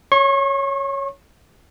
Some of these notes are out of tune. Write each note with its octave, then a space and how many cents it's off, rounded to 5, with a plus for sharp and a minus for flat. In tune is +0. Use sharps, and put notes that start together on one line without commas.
C#5 +0 C#6 -40